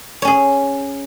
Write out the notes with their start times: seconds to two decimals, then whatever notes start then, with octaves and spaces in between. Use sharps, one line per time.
0.22 C#5
0.25 C#4
0.27 G#4